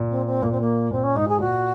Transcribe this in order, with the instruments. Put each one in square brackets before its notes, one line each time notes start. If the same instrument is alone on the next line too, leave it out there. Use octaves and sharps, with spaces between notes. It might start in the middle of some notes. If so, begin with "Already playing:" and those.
Already playing: [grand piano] A#2
[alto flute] C4
C4
[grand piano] A#2 [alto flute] A#3
[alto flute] C4
A#3
[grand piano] A#2 [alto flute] C4
[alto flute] C#4
[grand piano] G#2 [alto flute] D#4
[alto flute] G#4
[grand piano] A#2 [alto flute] F#4